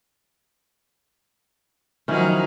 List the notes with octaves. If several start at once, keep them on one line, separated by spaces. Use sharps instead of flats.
D#3 F3 F#3 C#4 D#4 E4